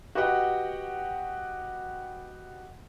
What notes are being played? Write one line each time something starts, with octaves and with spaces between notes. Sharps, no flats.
F#4 G4 B4 D#5 F#5 G5